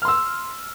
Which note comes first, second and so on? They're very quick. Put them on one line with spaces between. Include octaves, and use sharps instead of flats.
F6 C6 E6